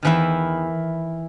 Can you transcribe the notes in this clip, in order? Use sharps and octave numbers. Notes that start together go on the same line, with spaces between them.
E2 D#3 E3 E4